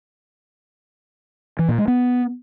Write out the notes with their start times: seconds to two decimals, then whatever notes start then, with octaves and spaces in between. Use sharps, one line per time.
1.59 E3
1.69 A#2
1.78 G#3
1.88 B3